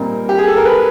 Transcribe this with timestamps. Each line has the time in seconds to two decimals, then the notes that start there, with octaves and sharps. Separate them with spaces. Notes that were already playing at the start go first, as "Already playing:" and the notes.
Already playing: A#2 G3 C4 D#4 A#4
0.29 G4
0.38 G#4
0.47 A4
0.57 A#4
0.65 B4